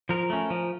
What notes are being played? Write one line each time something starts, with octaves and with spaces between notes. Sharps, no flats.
F3 A#4
A3 C#4
F3